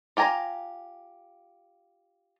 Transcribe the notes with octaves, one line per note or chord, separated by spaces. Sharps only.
F4 G4 G#5 A#5